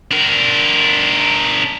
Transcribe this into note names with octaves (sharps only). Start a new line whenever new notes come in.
D4 A#4